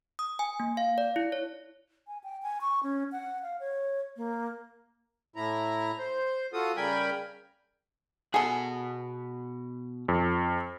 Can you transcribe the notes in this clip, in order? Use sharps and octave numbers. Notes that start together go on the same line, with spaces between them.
D#6
G#5
A#3
F5
D5
E4
C#5
G#5
G5
G#5
C#6
C#4
F#5
F5
C#5
A#3
A2 E4 A#5
C5
F4 F#4 A4 D#6
C#3 G3 A#4 G5 G#5 B5
B2 G#4 A4 F#5
F2